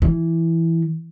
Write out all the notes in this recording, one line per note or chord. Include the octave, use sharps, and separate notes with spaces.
E3